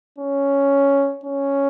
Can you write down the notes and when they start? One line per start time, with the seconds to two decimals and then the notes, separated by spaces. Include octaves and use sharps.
0.18 C#4
1.24 C#4